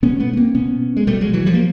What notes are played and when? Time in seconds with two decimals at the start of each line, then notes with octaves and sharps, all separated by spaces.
0.03 B2 B3 C#4
0.20 A3 B3
0.33 C#4
0.37 A#3 C4
0.55 B2 B3 C#4
0.97 G#3
1.07 B2 G3 A3
1.21 F#3 G#3
1.33 E3 F#3
1.46 F3 G3
1.54 A#3